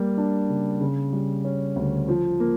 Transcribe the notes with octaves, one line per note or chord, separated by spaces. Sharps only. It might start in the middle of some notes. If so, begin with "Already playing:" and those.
Already playing: G3 A#3
D4
C#3
C#3
G3
C#4
D2
F3
A#3